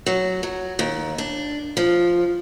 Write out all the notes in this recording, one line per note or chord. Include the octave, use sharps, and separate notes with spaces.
F#3
F#3
D#2
D4
F3